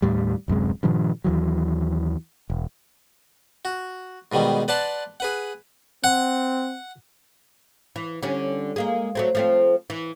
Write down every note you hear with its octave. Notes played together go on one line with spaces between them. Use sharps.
D#2 A2 G3
D1 F#2 C3 G#3
G2 A#2 D#3 F3
D#2 E3 F#3
E1
F#4
G#2 B2 D#3 G3
B4 D5 F#5 A5 C6
G#4 B4 F#5
C4 F#5
E3
D3 G3 C#4
G#3 A#3 G#4
F#3 A3 C4
F3 A3 C4
E3